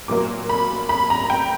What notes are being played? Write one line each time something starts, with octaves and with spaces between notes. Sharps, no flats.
A#2 F#3 A#3 D6
B5
B5
A#5
G5